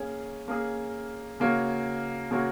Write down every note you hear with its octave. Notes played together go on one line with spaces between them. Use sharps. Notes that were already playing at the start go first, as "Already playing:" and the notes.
Already playing: A#3 C#4 G#4
A#3 C#4 G#4
C#3 A#3 F#4 C#5
C#3 A#3 F#4 C#5